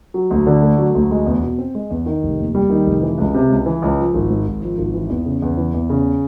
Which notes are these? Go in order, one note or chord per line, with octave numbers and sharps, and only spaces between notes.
F#3
D2
D3
A3
F#3
D2
G#3
E2
B2
C4
G#3
E2
D#3
F1
D#2
G3
D#3
F1
E3
C#2
C3
C#2
E3
C#2
F3
G#1
G#2
G#1
F3
G#1
E3
E2
C#3
E2
E3
E2
C#3